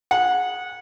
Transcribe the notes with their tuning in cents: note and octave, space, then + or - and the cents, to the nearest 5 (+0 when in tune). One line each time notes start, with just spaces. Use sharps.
G#4 +0 F#5 -20